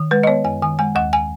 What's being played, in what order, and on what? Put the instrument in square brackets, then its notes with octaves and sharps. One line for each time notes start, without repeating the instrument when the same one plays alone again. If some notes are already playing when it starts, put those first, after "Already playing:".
Already playing: [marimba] D#3
G#3 B4
D#5
B3 C#5
F#2 G#5
D#3 G#5
G#3 G#5
D#2 F#5
G#5